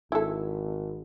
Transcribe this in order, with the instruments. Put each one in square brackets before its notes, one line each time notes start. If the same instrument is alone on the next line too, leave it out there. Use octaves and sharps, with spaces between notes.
[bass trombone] G#1 [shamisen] E4 A4